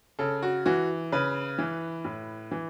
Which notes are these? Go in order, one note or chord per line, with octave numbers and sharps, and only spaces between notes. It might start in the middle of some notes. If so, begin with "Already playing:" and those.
C#3 A4
F#4
E3 F#4
C#3 B4
E3
A2
E3